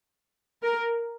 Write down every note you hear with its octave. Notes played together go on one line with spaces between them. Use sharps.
A#4